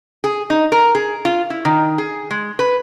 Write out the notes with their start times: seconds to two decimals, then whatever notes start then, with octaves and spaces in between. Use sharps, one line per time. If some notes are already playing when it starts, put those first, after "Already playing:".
0.24 G#4
0.50 D#4
0.72 A#4
0.95 G#4
1.25 F4
1.50 E4
1.65 D#3
1.98 G#4
2.31 G#3
2.59 B4